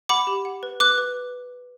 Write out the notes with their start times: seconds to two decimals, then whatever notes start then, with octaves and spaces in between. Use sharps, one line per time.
0.09 F#5 B5 D6
0.27 G4
0.45 F#5
0.63 B4
0.80 B4 D6 F#6
0.98 B4